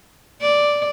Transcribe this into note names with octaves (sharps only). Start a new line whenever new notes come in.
D5